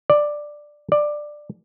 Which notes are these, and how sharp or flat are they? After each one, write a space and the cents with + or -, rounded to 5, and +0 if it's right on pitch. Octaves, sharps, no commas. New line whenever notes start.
D5 +5
D5 +10